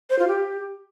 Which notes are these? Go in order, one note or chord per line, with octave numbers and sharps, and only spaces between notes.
C5
F4
G4